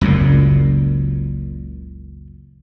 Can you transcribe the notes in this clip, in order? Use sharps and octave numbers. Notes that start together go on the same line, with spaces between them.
F#1 C#2 F#2 A#2